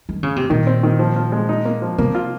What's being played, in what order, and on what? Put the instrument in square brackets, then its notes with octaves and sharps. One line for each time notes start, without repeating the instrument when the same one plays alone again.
[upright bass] D#3
C#3
C3
[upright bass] A#2 [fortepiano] D#3
[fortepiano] C4
D#3
F3
F3
G#3
D#4
A#3
F3
[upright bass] C3 [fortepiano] A#3
[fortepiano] F4